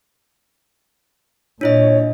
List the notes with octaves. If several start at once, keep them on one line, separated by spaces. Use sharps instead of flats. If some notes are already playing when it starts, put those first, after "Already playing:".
A#2 D4 E4 C#5 D#5